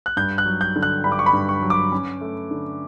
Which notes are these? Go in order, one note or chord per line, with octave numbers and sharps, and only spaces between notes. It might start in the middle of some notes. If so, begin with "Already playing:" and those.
F#6
G2 G6
F#6
F#3
G6
D3
F#6
G2 B5
D6
C#6
B5
G2
C#6
F#3
D6
C#4
A3
D3